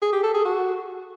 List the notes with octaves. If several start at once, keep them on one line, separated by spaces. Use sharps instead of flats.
G#4
G4
A4
G#4
F#4